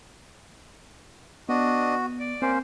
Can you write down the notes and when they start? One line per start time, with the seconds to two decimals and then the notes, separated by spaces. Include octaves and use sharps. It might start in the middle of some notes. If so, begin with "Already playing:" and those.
1.49 B3 D4 F#4 D#5
2.20 D5
2.42 A#3 C4 C#4 C5